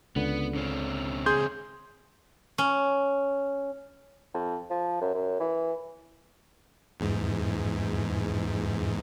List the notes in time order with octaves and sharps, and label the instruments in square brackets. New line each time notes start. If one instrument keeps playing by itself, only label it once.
[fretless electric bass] C#2 D3 [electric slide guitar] B3
[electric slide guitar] C#3 C4 C#4
[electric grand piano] G#4 C6 G6
[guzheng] C#4
[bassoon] F2
F3
F#2
F#2
E3
[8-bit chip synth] E2 G#2